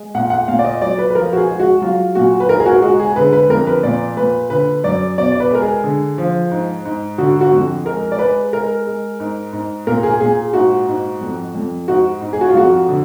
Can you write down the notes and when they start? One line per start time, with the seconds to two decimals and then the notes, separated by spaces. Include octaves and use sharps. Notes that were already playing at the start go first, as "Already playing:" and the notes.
Already playing: G#3
0.15 A#2 F#5
0.30 F#5
0.48 A#2 F5
0.59 D5
0.64 D#5
0.81 F#3 D5
0.98 B4
1.10 B4
1.15 F3 A#4
1.33 F#4
1.37 G#4
1.49 G#3
1.60 F#4
1.82 F#3 F4
2.15 A#2 F#4
2.40 B4
2.49 G#2 A#4
2.60 G#4
2.66 F#4
2.82 G#3 F#4
2.99 G#4
3.16 D3 B4
3.33 B4
3.49 F2 A#4
3.67 B4
3.83 A#2 D5
4.17 A#2 B4
4.50 D3 B4
4.84 F#2 D5
5.18 B2 D5
5.32 D5
5.40 B4
5.51 G#3 A#4
5.62 G#4
5.84 D3
6.18 F3
6.51 G#2
6.85 G#2
7.18 D3 F#4
7.41 F#4
7.52 F2
7.85 G#3 A#4
8.12 D5
8.19 G#3 B4
8.53 G#3 A#4
8.86 G#3
9.20 G#2
9.53 G#2
9.87 A#2 A#4
10.03 G#4
10.20 A#2 G#4
10.53 G#2 F#4
10.87 G#2
11.21 F2
11.55 F2
11.88 G#2 F#4
12.21 G#2
12.33 G#4
12.41 F#4
12.49 F4
12.55 F2 F#4
12.89 D3